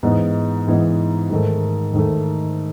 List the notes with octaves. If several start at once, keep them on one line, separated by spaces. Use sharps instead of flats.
G#2 E3 B3 D#4
G#2 E3 B3 D#4
G#2 D#3 A3
G#2 D#3 A3